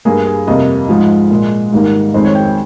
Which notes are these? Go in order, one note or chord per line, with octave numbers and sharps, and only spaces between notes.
G2 G3 A#3 G#4
G#4
F2 C3 G3 A#3 D#5
G#2 F3 G#3
A#2 G#3
G#2 D#3 G3 A#3
F2 D#3 G#3 C5
C#5
G5
G5